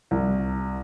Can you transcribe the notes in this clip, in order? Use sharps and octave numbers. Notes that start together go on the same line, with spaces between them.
C2